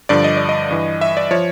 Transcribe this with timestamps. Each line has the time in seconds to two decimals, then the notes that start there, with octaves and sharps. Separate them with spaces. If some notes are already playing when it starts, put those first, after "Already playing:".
0.09 G2 D3 F3 D5
0.24 D#5
0.37 D5
0.49 D#5
0.71 G2 E3
1.01 E5
1.17 D5
1.31 F3 C#5